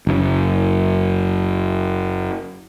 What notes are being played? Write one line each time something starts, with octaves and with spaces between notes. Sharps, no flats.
F#1 F#2